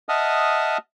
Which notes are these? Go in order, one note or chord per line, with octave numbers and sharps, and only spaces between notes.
D#5 E5 F#5 A5 D#6 F6